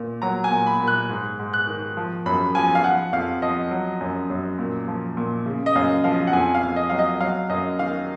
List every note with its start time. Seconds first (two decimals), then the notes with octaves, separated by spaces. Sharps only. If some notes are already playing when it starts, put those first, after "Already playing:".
Already playing: A#2
0.22 F#3 A#5
0.44 G#5
0.51 A#2
0.66 B5
0.80 A#2
0.87 F#6
1.09 G#2
1.39 G#2
1.53 F#6
1.67 D#3
1.97 F3
2.26 F#2 B5
2.55 F3 G#5
2.75 F5
2.84 F3 F#5
3.13 F2 F5
3.42 F3 D#5
3.71 F#3
4.01 F#2
4.30 F#2
4.59 A#2
4.88 F3
5.17 A#2
5.46 C#3
5.66 D#5
5.75 F#2 F5
6.04 F3 F5
6.27 F#5
6.33 F2 G#5
6.54 F5
6.63 F2
6.76 D#5
6.90 F#3 F5
6.99 D#5
7.21 F#3 F5
7.49 F#2 D#5
7.79 D#3 F5